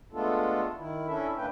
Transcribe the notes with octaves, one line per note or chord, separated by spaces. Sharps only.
G#3 A3 B3 D4 F4 A4
D#3 E4
C#4 D4 E4 A4 E5
D#2 A2 A#3 D4 B4 G5